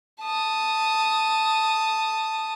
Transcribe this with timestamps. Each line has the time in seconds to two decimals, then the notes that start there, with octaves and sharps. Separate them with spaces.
0.22 A5 D#6